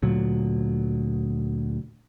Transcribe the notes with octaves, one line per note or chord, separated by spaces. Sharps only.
D2 A#2 F#3